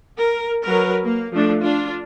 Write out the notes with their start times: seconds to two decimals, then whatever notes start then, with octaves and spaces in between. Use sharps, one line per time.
0.19 A#4
0.66 F#3 A#4 B4
1.03 A#3
1.32 F3 A3 D4
1.62 D4 F4